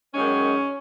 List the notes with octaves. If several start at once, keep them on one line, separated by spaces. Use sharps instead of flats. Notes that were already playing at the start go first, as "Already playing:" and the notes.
F#2 D#3 G#3 C#4